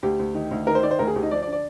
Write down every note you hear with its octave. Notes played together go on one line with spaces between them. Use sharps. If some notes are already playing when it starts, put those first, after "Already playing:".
D2 G4
D2
D#3
D2
D#3 A#4
C5
D#3 D5
C5
D2 A#4
G#4
D2 G4
D#4
F3 D5
D5
D3
D5